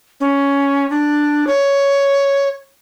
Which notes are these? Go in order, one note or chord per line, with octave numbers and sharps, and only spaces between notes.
C#4
D4
C#5